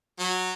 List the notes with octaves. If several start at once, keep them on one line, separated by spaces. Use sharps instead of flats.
F#3